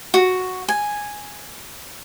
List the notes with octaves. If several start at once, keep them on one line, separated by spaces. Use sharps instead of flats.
F#4
G#5